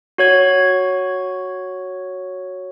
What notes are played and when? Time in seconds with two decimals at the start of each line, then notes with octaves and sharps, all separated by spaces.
0.18 F#4 C#5 G#6